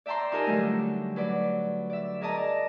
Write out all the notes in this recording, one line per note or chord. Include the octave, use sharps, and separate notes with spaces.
D5 E5 G5 A5 A#5 C6
D#4 F4 G4 A#4 G#5 A5
D3 F#3 G3 A3
F#3 B4 D5
D5 E5
G#4 A#4 D5 D#5 A5 A#5